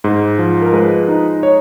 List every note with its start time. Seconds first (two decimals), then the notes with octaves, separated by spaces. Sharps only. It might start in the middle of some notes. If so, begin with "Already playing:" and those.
0.04 G#2
0.39 F3
0.62 A#4
0.73 G#3 B4
1.08 D#4
1.43 C#5